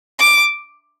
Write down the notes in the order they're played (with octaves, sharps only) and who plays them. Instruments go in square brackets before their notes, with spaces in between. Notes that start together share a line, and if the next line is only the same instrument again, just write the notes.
[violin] D6